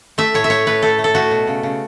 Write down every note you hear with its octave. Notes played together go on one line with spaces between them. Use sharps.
A3 E5
A2 C#5
E5
A3 C#5
A3 B4
A3 A4
A3
A4
A3 F#4
B2
C#3
C#3